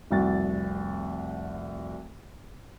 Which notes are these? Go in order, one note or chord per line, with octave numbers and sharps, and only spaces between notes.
F1 C2 F#4 A6